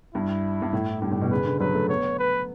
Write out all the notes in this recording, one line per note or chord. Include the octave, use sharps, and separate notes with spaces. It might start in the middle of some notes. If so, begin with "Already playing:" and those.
G2 E4
G2
A2
G2 G4
A2
B2
C#3 B4
D3
F#3 B4
A3
B3 C#5
B4